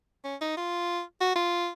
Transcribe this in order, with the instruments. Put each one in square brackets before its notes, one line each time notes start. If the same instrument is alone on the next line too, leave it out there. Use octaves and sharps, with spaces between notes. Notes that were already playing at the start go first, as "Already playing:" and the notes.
[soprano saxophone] C#4
D#4
F4
F#4
F4